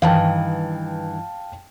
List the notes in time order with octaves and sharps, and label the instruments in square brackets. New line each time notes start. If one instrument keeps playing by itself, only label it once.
[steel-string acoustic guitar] G2 D#3 E3 [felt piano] F5 G5 A5